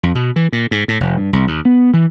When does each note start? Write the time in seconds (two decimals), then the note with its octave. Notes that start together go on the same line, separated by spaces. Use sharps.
0.03 F2
0.15 B2
0.36 E3
0.53 A#2
0.71 G#2
0.88 A2
1.00 F1
1.17 G2
1.33 C2
1.47 D#2
1.65 B3
1.94 E3